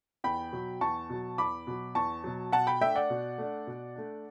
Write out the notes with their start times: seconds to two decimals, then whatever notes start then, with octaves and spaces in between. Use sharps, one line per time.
0.24 E2 G5 B5
0.53 B2 F#3
0.81 E2 A5 C#6
1.10 B2 F#3
1.38 E2 B5 D6
1.67 B2 F#3
1.95 E2 A5 C#6
2.24 B2 F#3
2.52 B2 F#5 A5
2.67 G5 B5
2.81 A3 D4 E5 G5
2.95 D5 F#5
3.10 B2
3.38 A3 D4
3.67 B2
3.96 A3 D4